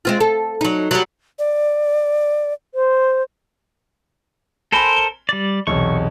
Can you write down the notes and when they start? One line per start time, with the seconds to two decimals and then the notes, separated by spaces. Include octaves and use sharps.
0.05 G#3 C4 F4
0.20 A4
0.61 F#3 D#4
0.91 F#3 G3
1.39 D5
2.74 C5
4.72 A4 A#4 C5 G#5 B5 C6
4.97 G7
5.29 G3 D5
5.67 B1 E2 C3 C#6